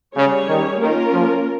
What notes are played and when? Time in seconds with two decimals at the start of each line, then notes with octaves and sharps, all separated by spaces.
0.16 C#3 G3 C#4 G#4 C#5
0.48 D#3
0.80 D#3 A#3 C#4 F4 A#4
1.13 F3